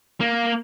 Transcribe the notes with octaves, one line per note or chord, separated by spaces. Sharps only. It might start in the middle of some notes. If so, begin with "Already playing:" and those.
A#3